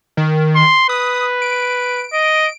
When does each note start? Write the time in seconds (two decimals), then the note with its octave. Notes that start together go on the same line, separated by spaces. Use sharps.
0.17 D#3
0.56 C6
0.89 B4 D#6
1.42 D7
2.13 D#5